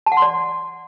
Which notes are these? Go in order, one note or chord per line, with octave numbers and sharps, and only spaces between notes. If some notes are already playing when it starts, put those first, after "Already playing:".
A5
F#5
C6
D5